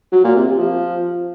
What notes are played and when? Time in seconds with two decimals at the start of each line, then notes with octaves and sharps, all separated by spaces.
0.12 F#3
0.24 A#2
0.35 C3
0.47 C3
0.59 F3